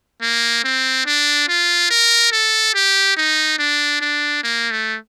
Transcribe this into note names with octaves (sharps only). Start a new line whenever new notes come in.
A#3
C4
D4
F4
A#4
A4
G4
D#4
D4
D4
A#3
A3